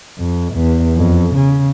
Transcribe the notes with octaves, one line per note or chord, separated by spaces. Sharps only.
F2
E2
F2
C#3